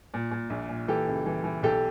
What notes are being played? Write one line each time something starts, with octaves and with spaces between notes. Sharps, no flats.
A#2
A#2
A#1
A#2
E3 G4 A4
C#2
E3
E3
B1 G4 A4